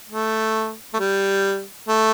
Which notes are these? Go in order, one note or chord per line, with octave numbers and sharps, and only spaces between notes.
A3
A3
G3
A3